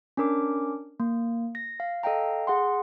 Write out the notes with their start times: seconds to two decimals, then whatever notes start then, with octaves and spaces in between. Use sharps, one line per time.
0.17 C#4 D4 A#4 D6
1.00 A#3
1.55 A#6
1.80 F5
2.03 A4 D#5 F5 G5 A#5
2.47 G#4 F#5 C6